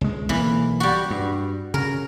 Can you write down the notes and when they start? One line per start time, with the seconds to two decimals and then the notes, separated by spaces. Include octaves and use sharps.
0.01 C#2 G#3
0.29 B1 E3 F#3 A#3
0.80 G3 F#4
1.11 G2
1.74 C#3 A#4